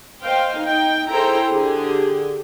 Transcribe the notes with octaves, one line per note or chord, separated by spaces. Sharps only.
C5 D#5 F5 G5
D#4 G5
E4 G#4 A4 C5 G5 A#5
D3 G4 G#4